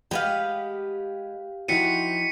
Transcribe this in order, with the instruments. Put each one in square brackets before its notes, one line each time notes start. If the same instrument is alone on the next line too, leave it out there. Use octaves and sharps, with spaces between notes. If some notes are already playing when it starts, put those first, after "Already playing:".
[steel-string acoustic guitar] G#3 [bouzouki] G4 B4 F5 [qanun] D#5 F#5
[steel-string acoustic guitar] F3 D#4 [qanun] C4 E4 F#4 [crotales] B6 C#7 D#7